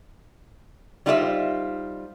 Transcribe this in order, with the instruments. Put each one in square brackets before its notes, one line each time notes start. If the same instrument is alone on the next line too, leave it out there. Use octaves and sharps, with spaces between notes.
[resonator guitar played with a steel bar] G3 D#4 F4 C5 D5 E5